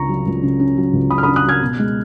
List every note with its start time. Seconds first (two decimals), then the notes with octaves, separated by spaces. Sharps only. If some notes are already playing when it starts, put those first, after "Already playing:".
Already playing: C#2 C#3 C#4 A#5 C#6
0.09 F#3
0.26 C#2
0.43 C#3
0.60 C#4
0.77 F#3
0.93 C#2
1.10 C#3 B5 D#6
1.18 F6
1.23 B5 D#6
1.28 C#4
1.36 D#6 F#6
1.45 F#3 F6 G#6
1.62 B2
1.79 G#3